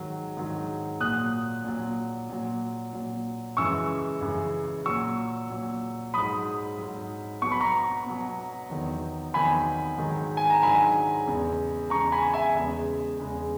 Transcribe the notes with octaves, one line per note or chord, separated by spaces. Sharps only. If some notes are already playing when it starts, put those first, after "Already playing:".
Already playing: G#2 D#3 F#3
G#2 D#3 F#3
A#2 F#3 D#6 F#6
A#2 F#3
A#2 F#3
A#2 F#3
F#2 C#3 E3 G#3 C#6 E6
F#2 C#3 E3 G#3
A#2 F#3 C#6 E6
A#2 F#3
G#2 F#3 B5 D#6
G#2 F#3
B2 F#3 C#6
B5
A#5 C#6
B2 F#3
E2 D#3 F#3
E2 D#3 F#3 G#5 B5
G#2 D#3 F#3
G#5
A#5
G#2 D#3 F#3 G#5 B5
E2 C#3 G#3
E2 C#3 G#3 A#5 C#6
G#5 B5
E5 G#5
E2 C#3 G#3
E2 C#3 G#3